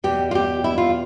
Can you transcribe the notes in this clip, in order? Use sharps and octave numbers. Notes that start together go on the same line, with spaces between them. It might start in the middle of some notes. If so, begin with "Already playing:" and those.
E2 B2 G4
F4
G4
E4
F4